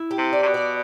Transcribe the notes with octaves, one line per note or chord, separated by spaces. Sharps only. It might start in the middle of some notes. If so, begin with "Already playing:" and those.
Already playing: E4
G4
C3
D5
C3
B2
D5